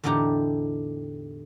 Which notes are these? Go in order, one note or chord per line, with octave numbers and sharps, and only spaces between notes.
E2 A2 D3 D#4 G4 A#5